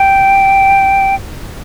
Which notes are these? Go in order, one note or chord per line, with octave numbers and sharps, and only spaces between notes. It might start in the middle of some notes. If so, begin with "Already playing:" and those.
Already playing: G5